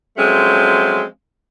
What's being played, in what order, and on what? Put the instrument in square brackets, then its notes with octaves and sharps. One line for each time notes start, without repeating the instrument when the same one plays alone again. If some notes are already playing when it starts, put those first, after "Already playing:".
[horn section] F3 F#3 G#3 A3 C4 C#4